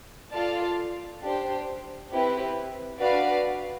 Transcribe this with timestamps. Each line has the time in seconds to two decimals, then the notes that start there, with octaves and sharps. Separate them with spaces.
0.32 F4 A4 D5 F5 A5
1.21 D4 G4 C5
2.11 C4 E4 G4 B4
2.99 D4 F#4 B4 D5 F5